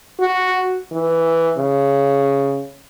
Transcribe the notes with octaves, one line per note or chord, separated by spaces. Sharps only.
F#4
E3
C#3